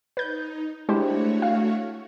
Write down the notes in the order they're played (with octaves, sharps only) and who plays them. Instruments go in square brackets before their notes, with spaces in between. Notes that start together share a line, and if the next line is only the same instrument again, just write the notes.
[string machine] D#4 [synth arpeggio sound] B4 G6
[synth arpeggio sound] G#3 G4 C5 [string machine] A3 F#4 C#5 [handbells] D4 E4
[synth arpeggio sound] F5